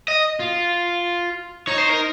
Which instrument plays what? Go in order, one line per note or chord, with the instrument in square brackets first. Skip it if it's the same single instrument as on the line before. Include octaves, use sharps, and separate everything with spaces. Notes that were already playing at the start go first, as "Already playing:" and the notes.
[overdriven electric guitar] D#5
[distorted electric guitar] F4
[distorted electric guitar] D#4 [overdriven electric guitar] C#5
[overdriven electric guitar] C5
A#4